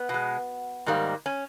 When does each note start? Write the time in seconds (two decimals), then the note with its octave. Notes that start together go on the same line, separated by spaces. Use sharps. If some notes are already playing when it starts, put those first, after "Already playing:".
Already playing: B3
0.09 B2 G#3
0.86 G#2 D#3 G3 A#3
1.26 C#4